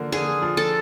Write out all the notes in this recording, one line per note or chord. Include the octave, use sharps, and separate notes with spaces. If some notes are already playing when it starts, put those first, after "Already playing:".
Already playing: D3 F3 A#3
D3 G#4
F3
A4